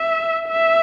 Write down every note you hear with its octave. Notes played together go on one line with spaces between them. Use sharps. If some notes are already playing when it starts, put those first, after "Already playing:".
Already playing: E5
E5